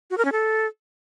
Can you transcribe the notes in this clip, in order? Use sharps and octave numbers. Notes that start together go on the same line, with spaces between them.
F#4
A#4
C#4
A4